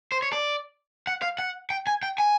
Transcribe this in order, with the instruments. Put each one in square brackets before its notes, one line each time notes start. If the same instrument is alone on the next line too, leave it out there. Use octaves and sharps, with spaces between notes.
[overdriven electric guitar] C5
C#5
D5
F#5
F5
F#5
G5
G#5
G5
G#5